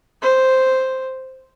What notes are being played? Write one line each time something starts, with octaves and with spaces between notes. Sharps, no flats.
C5